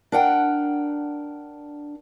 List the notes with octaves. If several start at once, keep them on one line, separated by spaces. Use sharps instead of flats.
D4 A#4 F#5 G5